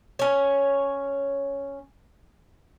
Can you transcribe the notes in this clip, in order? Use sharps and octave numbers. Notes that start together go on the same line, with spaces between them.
C#4 C#5